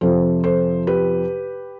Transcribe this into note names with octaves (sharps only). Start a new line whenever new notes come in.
F2 C3 F3 A4 C5
A4 C5
G4 B4